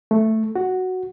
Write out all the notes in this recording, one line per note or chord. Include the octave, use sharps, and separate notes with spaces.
A3
F#4